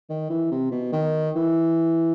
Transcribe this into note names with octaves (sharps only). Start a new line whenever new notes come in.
D#3
E3
C3
B2
D#3
E3